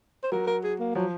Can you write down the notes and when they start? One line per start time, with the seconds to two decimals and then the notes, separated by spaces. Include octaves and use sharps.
0.23 C5
0.32 F#3 A#4
0.47 A#4
0.63 G#4
0.79 A#3
0.95 F3 F#3